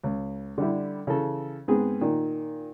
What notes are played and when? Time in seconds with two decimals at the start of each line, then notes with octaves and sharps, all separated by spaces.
0.04 C#2
0.58 D3 G3 E4
1.07 C#3 E3 A4
1.68 G#2 B3 C4 G#4
2.01 A#2 D#3